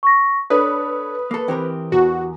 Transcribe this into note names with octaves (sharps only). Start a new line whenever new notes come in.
C#6 A#6
D4 A4 B4 C#5 D#6
A#3 A4
E3 C4 G4 A#4
E2 F#4